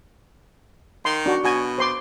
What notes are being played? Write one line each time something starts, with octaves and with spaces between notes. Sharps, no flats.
D#3 C6
D4 F#4
B2 F#4 G#5
C5 C6 D6